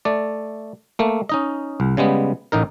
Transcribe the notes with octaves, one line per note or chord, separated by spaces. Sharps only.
A3 D5
A3 A#3
C#4 D#4 D#5
C2
C#3 G3 G#3 B3
A1 A2 D#4 A#4